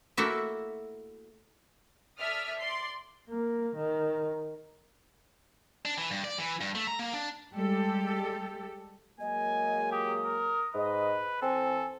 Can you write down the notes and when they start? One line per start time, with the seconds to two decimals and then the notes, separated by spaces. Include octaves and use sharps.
0.17 A3 A#3 E4 F#4 E5
2.19 A4 D5 E5 D#6 F6
2.59 D5 C6 C7
3.29 A#3
3.76 D#3
5.85 D4
5.98 E3
6.11 G2
6.24 D5
6.38 E3
6.61 G2
6.75 A3
6.87 A#5
6.99 A#3
7.13 D4
7.53 G3 G#3 G4 A4
9.20 F#3 G#3 A#3 D#5 G#5
9.92 G4 D#6
10.24 A#4
10.75 G#2 B4 D#5
11.42 E3 C4 A4 C5 G#5